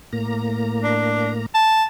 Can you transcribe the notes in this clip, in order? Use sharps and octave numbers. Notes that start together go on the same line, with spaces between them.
A2 A#3 A#5
D4
A5